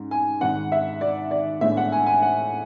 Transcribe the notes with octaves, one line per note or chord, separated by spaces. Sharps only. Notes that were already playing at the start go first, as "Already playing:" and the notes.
Already playing: G#2 G#3 C#4
G#5
G#1 G#2 G#3 F#5
E5
D5
D5
A2 G#3 B3 D4 E5
F#5
G#5
G#5
F#5